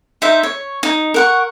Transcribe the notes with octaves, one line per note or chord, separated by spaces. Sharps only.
D#4 C5 E5
C#5
D#4
A#4 F#5 C#6